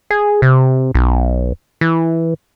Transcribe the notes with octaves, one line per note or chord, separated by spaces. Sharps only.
G#4
C3
B1
E3